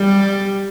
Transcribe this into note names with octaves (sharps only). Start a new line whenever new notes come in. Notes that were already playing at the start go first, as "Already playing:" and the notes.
Already playing: G3